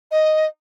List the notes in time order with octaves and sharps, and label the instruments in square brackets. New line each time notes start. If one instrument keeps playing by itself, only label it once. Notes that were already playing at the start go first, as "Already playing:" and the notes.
[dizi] D#5